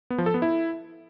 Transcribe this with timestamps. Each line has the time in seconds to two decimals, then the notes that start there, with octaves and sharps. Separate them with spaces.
0.10 B3
0.18 F3
0.26 A4
0.34 B3
0.42 E4